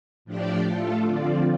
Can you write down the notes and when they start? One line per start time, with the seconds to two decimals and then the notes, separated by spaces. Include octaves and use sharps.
0.25 A2 F3 D4 G4 D5
0.65 A3 F4 A4
1.06 D3 F3 C4 F4 D5